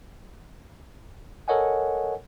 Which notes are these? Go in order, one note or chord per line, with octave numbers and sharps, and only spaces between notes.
A4 A#4 C#5 D#5 F#5 G#5